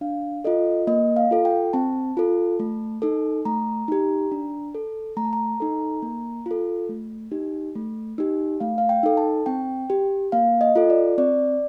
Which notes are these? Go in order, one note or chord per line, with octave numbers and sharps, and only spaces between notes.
D4 F5
F4 A4 D#5
A#3 D#5
F5
F4 A4
G5
C4 A5
F4 A4
A3
D#4 A4
A3 A#5
D#4 G4
D4
A4
A3 A#5
A5
A#5
D#4 A4
A#3
F4 A4
A3
D#4 G4
A3
D#4 G4
A3 F5
F5
G5
D#4 A4
A5
C4 G5
G4
A#3 F5
D#5
F4 A4
D5
C4 D5